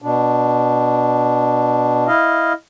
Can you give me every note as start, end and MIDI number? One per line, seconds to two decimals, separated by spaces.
0.02 2.07 47
0.02 2.07 62
2.07 2.53 64
2.07 2.53 75
2.07 2.53 77